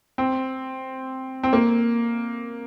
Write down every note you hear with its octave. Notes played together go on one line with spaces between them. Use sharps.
C4
C4
A#3